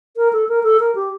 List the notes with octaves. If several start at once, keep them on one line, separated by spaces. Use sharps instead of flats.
A#4
A4
A#4
A4
A#4
G4